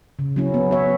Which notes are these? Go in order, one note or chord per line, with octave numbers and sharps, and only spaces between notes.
C#3
F#3 C#4 E4
B3
F#4 C#5 E5